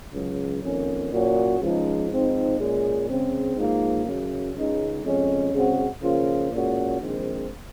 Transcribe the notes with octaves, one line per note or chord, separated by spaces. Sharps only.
C#2 C#3 F#3
F2 D#3 A#3 C#4
A#2 F#3 C#4 F#4
C#2 C#3 F3 G#3 D#4
G#2 F3 C4 D#4
A#2 G#3 C#4 G#4
C#3 G#3 C4
G#2 F3 A#3
F#2 C#3 F#3
C#2 C#3 G#3 D#4
F2 C#3 G#3 C#4
C#3 G#3 C4 F#4
C#3 F3 A#3 F4
A#2 G#3 C#4 F#4
A#1 G#2 D#3 G#3 C4